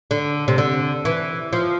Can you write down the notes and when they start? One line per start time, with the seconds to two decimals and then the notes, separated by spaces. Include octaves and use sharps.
0.11 D3
0.48 C3
0.58 D3
1.05 E3
1.53 F3